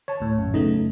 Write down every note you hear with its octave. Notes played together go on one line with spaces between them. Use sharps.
C#5 A5
D2 A2
A1 F#2
C#3 A3 B3 D#4